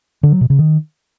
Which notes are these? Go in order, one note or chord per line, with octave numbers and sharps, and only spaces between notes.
D3
F#3
B2
C#3
D#3